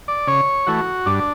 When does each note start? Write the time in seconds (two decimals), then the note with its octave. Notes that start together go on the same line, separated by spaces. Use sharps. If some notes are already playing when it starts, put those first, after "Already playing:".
0.08 D5
0.27 C#3 C#5
0.67 E3 A3 F#4
1.06 G2 D4